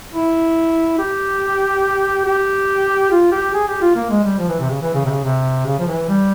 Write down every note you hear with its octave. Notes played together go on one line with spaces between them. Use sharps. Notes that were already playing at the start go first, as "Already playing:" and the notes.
E4
G4
G4
F4
G4
G#4
G4
F4
A#3
G#3
G3
F3
E3
C3
C#3
E3
C#3
C3
C#3
C3
C#3
F3
E3
G3